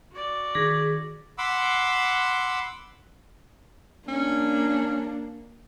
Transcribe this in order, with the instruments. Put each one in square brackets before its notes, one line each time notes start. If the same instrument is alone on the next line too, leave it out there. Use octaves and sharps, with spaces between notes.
[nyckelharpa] F#4 D5
[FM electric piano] D#3 B6 [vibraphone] G#4 [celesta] D6 G#6 A#6
[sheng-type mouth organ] F#5 B5 C6 D6 E6
[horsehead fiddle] A#3 D4 [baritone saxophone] C#4